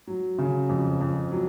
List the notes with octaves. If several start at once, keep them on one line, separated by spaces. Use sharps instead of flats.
F#3
C#3
F2
F2
F#3